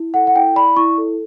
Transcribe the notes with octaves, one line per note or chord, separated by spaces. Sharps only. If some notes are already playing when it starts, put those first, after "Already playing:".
Already playing: E4
A4 F#5
F#5
E4 G5
D5 B5
E4 C#6
A4